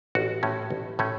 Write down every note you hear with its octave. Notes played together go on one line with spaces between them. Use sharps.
A1 F#4
A2 A3 C#4
A1
A2 A3 C#4